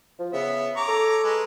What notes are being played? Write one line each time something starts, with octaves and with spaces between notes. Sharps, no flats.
F3
C#3 B3 E5
C#5 A#5 D6
A4
G#3 B4